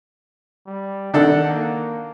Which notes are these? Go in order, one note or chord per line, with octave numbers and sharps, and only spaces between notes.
G3
D#3 D4 A4 F#5
A#3